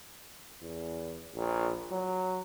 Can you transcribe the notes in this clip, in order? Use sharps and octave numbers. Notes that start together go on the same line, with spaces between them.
E2
A#1
F#3